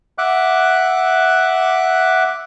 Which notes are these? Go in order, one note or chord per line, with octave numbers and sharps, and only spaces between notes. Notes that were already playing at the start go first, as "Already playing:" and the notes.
E5 F#5 D6 F#6